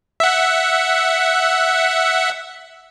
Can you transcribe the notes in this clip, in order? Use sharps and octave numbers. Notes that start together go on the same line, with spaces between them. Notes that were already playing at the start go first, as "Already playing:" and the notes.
E5 F#5